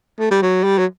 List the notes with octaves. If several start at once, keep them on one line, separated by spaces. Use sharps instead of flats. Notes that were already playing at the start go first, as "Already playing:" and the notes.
A3
G3
F#3
G3
F#3